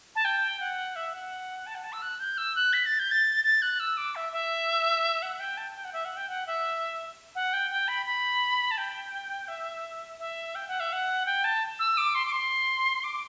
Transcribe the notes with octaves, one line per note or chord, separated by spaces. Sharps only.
A5
G5
F#5
E5
F#5
A5
F#5
A5
E6
F#6
G6
E6
F#6
B6
A6
G6
A6
A6
F#6
E6
D6
E5
E5
F#5
G5
A5
G5
F#5
E5
F#5
G5
F#5
E5
F#5
G5
G5
B5
B5
A5
G5
E5
E5
G5
F#5
E5
F#5
G5
A5
E6
D6
C6
D6
C6
D6